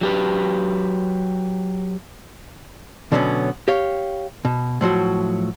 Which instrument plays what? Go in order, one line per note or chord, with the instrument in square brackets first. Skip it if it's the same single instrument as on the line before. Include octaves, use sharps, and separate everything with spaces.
[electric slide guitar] F#3 G4 B4
[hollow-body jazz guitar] B2 D3 F#3 A#3 B3 C#4
G4 C#5 F5
B2
A2 F3 F#3 F#4